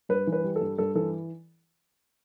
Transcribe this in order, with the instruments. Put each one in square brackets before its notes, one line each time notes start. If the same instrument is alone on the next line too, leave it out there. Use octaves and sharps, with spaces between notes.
[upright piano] G2 B4
E3
B4
G3
A4
G2
G2 A4
E3 A4